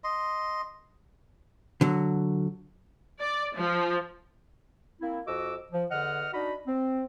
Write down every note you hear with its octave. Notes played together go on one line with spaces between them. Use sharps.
D#5 C6
D3 F#3
D5
F3
A#3 C4 E4
F2 F#4 D#5 D6 E6
F3
E2 D3 D#5 F#5 F6
D4 D#4 F#4 D#5 B5
C4